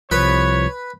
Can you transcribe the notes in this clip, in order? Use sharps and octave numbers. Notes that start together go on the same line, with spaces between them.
C2 F3 B4 C#5